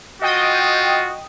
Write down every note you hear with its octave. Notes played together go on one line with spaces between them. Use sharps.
F4 F#4 D#5 G5 D#6